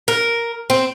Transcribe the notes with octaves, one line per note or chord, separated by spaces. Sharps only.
A#4
C4